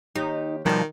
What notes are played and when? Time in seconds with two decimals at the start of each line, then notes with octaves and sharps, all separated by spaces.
0.15 D#2 D#4 G4
0.66 B2 D#3 F3 G3 F#4 D5 A5